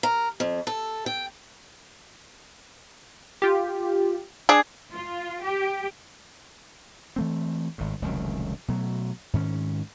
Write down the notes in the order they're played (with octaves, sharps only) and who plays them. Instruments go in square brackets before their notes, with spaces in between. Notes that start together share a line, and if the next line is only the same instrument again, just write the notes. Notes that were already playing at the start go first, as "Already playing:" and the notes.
[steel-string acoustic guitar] A#4
F2
A4
G5
[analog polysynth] F4 G4
[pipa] D4 G#4
[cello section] F4
G4
[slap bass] E3 A3 C4
G#1 A2
F1 C#2 D#3 F#3
B2 F#3 A3
G#2 D#3 C#4